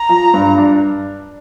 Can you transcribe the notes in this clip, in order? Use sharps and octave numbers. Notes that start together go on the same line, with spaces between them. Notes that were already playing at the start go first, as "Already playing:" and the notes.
Already playing: A#5
F3
G2
D4